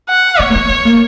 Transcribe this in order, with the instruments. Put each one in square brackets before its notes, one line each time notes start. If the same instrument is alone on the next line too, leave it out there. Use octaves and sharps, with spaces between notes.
[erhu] F#5
[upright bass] B3 [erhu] C#5
[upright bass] A#3
B3
B3
A#3